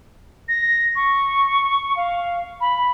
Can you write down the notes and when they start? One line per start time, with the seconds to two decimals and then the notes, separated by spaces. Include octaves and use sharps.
0.48 A#6
0.96 C#6
1.96 F5
2.61 B5